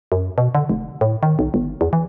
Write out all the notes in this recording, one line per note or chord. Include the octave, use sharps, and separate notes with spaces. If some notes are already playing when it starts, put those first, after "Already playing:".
F#2
B2
D3
F1
A2
D#3
B1
G1
E2
E3